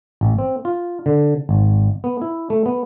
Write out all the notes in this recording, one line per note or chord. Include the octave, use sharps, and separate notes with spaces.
A1
C4
F4
D3
G#1
B3
E4
A3
B3